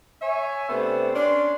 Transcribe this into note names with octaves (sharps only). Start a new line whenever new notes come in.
C#5 E5 G#5
C3 A3 B3 C4 D4 C5
C#4 D4 C6